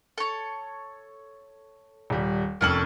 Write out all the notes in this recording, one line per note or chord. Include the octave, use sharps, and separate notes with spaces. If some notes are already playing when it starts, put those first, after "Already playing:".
A4 C#5
D#1 G3
F1 F2 A#3 C#4 A4 F#7